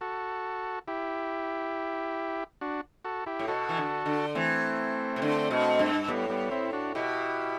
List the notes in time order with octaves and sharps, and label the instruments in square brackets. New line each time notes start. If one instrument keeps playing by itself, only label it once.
[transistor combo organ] F#4 A4
E4 G4
D4 F#4
F#4 A4
E4 G4
[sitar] A2
[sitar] B2 [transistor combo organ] F#4 A4
[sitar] E3
D3
D3
[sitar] E3 [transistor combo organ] A3 C4
[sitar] C3
D3
B2
G2
[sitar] A2 [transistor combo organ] G3 B3
[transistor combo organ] G3 B3
C4 E4
D4 F#4
[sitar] B2 [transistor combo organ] E4 G4